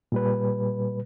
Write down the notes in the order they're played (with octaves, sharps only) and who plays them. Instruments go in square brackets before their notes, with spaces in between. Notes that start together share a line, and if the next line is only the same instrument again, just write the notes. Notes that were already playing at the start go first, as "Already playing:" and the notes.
[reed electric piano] A#2 G3 B4